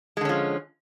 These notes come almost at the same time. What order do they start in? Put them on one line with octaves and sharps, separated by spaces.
G#3 D3 C#4 F3